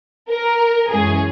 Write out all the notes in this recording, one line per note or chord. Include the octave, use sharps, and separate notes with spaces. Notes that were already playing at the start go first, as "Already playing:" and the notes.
A#4
F#2 E3 G#3 C#4 G#4